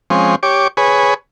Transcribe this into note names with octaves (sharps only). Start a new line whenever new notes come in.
F3 G#3 C4 C#4
G4 C#5 D6
G#4 B4 C#5